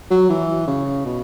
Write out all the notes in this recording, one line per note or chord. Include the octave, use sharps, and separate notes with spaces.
F#3
E3
C#3
B2